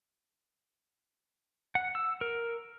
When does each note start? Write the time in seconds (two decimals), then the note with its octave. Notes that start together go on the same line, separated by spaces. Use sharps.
1.75 F#5
1.95 E6
2.21 A#4